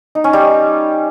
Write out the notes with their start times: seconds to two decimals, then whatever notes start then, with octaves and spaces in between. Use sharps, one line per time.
0.15 D#4
0.24 C#4
0.33 G3